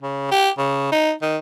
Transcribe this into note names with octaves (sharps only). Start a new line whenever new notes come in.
C#3
G4
C#3
D#4
D#3